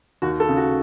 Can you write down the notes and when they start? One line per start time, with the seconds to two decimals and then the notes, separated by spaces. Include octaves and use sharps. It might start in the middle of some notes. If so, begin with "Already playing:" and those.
0.22 D#2 F#4
0.40 A4
0.49 C#3
0.57 F#4